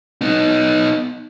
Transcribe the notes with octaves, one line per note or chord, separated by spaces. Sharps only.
B3 D#4